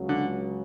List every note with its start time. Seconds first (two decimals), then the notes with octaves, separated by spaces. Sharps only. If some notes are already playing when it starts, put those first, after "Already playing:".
Already playing: C#2 C#3 F#3
0.09 D3